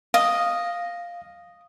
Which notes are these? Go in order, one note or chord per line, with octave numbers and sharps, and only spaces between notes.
D#5 F5